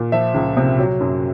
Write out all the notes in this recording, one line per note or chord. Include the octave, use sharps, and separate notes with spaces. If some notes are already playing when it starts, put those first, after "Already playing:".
Already playing: A#2
F3 E5
C#2
C3
F#3
F#2